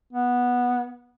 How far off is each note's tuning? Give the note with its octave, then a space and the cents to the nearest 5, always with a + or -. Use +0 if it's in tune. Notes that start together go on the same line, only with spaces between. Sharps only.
B3 -10